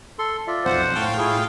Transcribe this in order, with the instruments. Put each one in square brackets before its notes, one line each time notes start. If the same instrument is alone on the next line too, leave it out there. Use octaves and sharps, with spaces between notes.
[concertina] A4 C6
F4 D5 E5
[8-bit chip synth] B1 F2 [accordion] C5 F#5
[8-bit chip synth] A2 F5 G5 [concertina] A5 C6 C#6
[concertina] E4 C#6 [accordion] F4 G#4